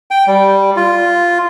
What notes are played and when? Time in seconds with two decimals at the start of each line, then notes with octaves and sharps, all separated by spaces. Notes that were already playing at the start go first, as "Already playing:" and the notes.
0.11 G5
0.27 G3
0.77 F4